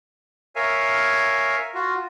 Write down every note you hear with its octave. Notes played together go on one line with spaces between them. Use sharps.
A#4 C#5 E5 F5 G#5
F4 F#4